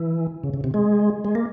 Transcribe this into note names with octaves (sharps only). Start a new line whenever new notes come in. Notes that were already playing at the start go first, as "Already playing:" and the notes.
Already playing: E3
C#3
C#3
C3
G#3
G#3
A#3